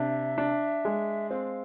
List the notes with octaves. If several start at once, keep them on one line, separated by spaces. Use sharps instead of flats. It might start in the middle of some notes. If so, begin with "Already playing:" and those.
Already playing: C3 D4 E5
D4
G#3
C4 F5